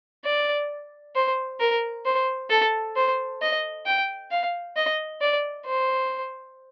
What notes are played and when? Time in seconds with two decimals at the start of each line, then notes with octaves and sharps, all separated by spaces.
0.24 D5
1.15 C5
1.60 A#4
2.05 C5
2.50 A4
2.96 C5
3.41 D#5
3.86 G5
4.31 F5
4.76 D#5
5.21 D5
5.66 C5